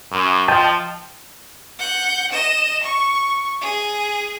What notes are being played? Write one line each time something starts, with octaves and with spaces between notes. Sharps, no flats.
F#2
F3 D#5 G5 A5
F#5 G6
D#5 E7
C#6
G#4